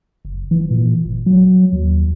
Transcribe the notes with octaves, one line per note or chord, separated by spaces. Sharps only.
F#1
E3
A#2
G1
F#3
D#2